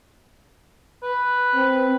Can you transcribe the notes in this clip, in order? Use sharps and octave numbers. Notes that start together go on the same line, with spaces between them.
B4
C4